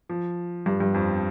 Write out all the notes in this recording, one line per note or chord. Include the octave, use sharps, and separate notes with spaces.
F3
G2
G2
F2